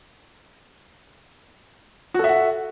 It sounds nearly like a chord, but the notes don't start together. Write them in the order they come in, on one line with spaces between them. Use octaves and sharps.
F#4 A4 E5 F#5